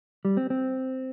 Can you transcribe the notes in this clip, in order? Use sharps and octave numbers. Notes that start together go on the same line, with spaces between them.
G3
C4
C4